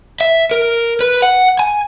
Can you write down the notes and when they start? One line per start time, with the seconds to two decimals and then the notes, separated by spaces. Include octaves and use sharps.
0.21 E5
0.51 A#4
1.01 B4
1.22 F#5
1.59 G#5